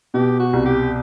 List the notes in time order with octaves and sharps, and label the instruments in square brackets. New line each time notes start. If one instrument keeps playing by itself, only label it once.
[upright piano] B2 [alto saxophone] G4
[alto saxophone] F#4
[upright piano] C2
[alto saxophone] G4